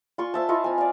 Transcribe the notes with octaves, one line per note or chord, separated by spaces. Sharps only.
F4 C6 C#6
C5 E5 A5
E4 F4 D#5 C#6
C4 G#5
D5 F5